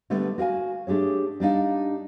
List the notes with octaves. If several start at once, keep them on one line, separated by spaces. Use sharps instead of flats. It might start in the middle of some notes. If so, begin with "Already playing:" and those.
D3 G3 A3 B3
F#4 A#4 F5 G#5
A3 D4 G4 G#4 C#5
G3 D4 D#4 F5